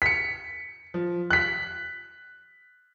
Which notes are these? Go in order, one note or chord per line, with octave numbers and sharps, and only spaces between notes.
B6 C#7
F3
F#6 B6